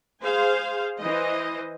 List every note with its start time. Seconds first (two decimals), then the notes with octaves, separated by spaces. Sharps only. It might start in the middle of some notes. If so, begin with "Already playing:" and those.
0.21 G#4 C5 F5
0.99 E3 C5 D#5